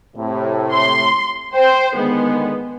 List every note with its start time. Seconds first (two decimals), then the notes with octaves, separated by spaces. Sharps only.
0.16 A2 C3
0.72 C6
1.54 C5 G5
1.95 D3 D#3 G#3 B3